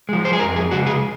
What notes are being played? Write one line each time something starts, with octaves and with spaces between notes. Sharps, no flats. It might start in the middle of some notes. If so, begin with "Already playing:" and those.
F3 G#3
C5
G#4
F2 A#4
G#4
C#3 G#3 F#4
G#4